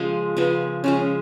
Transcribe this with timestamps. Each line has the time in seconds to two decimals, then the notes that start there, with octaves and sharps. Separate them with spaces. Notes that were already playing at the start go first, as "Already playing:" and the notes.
Already playing: C#3 F3 G#3
0.37 C#3 F3 G#3 B3
0.84 C#3 F3 G#3 C#4